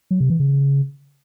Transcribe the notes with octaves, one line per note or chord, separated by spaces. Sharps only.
F#3
C3
E3
C#3